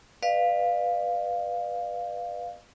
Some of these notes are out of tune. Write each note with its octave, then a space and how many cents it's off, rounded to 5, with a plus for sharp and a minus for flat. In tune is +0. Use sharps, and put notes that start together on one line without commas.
B4 +0 D5 +45 F5 +0